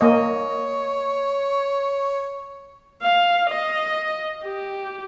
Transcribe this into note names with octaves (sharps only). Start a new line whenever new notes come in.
A#3 C#5 D#5
F5
D#5
G4